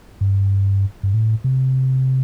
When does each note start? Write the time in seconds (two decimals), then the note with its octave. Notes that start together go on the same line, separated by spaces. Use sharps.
0.21 G2
1.03 G2
1.14 A2
1.44 C3